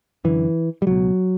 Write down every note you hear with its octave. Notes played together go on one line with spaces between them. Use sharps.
F#2 D3 E3
G3
C#2 B2 F#3